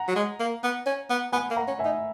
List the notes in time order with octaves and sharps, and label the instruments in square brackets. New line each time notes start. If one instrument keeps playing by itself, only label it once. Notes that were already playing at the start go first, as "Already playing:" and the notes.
Already playing: [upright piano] F#5 A#5
[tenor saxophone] F#3
G#3
A#3
B3
C#4
B3
[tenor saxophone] B3 [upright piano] G#5 B5
[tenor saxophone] A#3
[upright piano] F#5 A#5
[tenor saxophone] C#4
[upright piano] E5 G#5
[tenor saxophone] D#4